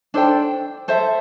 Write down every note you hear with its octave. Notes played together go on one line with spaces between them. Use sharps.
D4 A4 C5 G5
A4 C5 E5